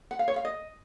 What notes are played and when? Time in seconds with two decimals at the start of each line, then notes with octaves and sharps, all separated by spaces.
0.11 F#5
0.19 F5
0.28 C#5
0.36 F5
0.45 D#5